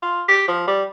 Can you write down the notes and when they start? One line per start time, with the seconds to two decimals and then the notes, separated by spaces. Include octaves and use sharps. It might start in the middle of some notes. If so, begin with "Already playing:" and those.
0.03 F4
0.28 G4
0.48 F3
0.68 G3